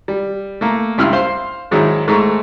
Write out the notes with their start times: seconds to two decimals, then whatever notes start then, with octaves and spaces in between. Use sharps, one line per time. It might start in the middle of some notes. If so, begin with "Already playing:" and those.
0.08 G3
0.61 A3 A#3
0.98 C#2 G2 E4 E6 F6
1.13 C5 F5 C6
1.71 G#2 D#3 F#3 G#3 D#4 E4
2.08 G#2 G#3 A3 A4 A#5 C#6